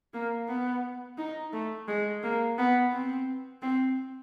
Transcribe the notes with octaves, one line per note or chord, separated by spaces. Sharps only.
A#3
B3
D#4
A3
G#3
A#3
B3
C4
C4